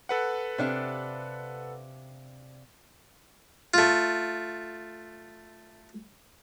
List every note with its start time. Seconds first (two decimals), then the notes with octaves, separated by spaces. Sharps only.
0.09 A4 B4 F#5
0.58 C3 D4 F5
3.74 A3 F4